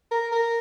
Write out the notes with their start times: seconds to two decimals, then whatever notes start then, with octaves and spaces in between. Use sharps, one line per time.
0.11 A#4
0.32 A#4